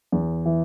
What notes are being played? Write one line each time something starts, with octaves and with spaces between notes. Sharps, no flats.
E2
E3